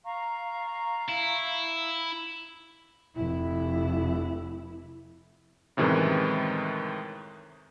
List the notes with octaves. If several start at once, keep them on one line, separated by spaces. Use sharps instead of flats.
F5 A#5 C#6
E4
F1 E4
F#2 A2 C3 D#3 E3 G#3